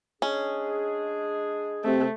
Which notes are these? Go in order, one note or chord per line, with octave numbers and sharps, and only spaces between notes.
G#3 C#4 D4 G#4
C3 A3